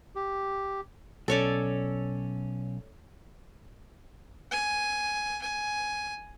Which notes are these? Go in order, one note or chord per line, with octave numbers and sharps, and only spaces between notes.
G4
B1 C#4 A4 C#5 D5
G#5
G#5